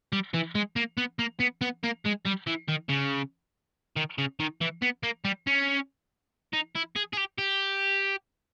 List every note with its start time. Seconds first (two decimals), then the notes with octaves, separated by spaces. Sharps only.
0.13 G3
0.34 E3
0.55 G#3
0.76 A#3
0.98 B3
1.19 A#3
1.40 B3
1.61 B3
1.83 A#3
2.05 G#3
2.25 G3
2.47 E3
2.69 D#3
2.89 C#3
3.97 D#3
4.18 C#3
4.40 D#3
4.61 E3
4.82 B3
5.03 A#3
5.25 G3
5.47 C#4
6.53 D#4
6.75 E4
6.96 G#4
7.13 G#4
7.17 G4
7.38 G4